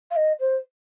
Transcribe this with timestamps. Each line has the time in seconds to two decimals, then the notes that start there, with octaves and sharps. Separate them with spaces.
0.11 F5
0.16 D#5
0.39 C5